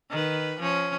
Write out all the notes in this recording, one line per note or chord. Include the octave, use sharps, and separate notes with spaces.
D#3 B4
F3 C#4